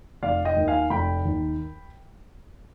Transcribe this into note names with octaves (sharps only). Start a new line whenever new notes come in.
F1 D5 F5
D#5 G5
D#2 D#3
F5 G#5
F1 G5 B5
D#2 D#3